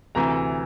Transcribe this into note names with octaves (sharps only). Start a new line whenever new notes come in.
D2 C3 E3 A#5